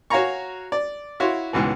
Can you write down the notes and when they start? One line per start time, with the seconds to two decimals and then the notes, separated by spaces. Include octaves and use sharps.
0.10 F#4 C#5 F5 G#5 A#5 C#6
0.72 D5
1.20 E4 F#4 C#5 F5 C6
1.53 C#2 G#2 B2 E3